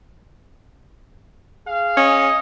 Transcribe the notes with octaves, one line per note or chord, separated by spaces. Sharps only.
G#4 F5
C#4 D#5